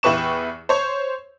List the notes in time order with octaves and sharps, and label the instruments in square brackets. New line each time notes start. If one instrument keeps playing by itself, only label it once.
[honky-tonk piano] E2 E4 G4 B4 C#6 E7
C5 C#5